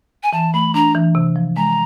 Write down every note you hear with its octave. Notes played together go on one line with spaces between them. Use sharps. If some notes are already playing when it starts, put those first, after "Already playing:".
G#5
E3 A5
A3 B5
D4 A#5
E3
C3
F3
G#3 A#5